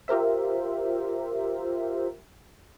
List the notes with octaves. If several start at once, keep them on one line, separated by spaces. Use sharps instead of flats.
F4 G4 A#4 C5 E5